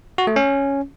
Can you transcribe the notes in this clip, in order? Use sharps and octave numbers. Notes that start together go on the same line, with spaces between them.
F#4
A3
C#4